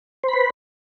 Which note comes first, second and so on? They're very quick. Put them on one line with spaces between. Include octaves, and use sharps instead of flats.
C5 B5 B4